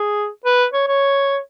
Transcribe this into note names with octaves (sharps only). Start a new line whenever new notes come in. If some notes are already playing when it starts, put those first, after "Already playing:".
Already playing: G#4
B4
C#5
C#5